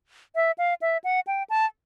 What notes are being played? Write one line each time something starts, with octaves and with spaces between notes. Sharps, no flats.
E5
F5
E5
F#5
G5
A5